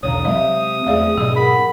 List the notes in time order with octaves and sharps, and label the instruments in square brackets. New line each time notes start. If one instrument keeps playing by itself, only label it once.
[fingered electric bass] B1 E2 D3 [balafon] C#5 [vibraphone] D5 F5 A#5 [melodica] D#6
[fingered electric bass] C3 C4 [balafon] F#3 G#3 D#5 [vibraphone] E5
[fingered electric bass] E2 A3 [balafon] G#4 D5 F5
[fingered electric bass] G#2 B2 F#3 [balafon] G#4 D#5
[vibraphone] A#4 F#5 [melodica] B5